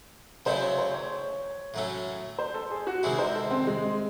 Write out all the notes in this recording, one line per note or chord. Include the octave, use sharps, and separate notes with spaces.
C#3 F#3 A3 C#4 E4 C5
C#5
C5
C#5
A2 F#3 A3 C#4
C5
A4
G#4
F#4
C3 D#3 G#3 C4 E4 G#4
C5
A4
C4
G#3